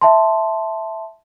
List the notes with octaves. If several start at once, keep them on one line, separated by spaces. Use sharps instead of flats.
E5 A5 C6